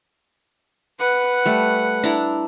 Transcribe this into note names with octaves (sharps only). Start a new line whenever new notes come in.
B4 F#5
G3 A3
D4 E4 A#5